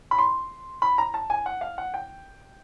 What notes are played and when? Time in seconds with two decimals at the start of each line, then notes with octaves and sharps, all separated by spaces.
0.11 B5
0.18 C6
0.82 B5
0.98 A#5
1.14 A5
1.30 G#5
1.46 F#5
1.61 F5
1.78 F#5
1.94 G5